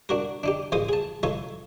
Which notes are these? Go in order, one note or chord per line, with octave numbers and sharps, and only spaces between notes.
D4 F#4 A#4
D4 D#4 G4
A1 G#3 F4 C5 D#6
G#4 A5
D#4 F4 A4 C#5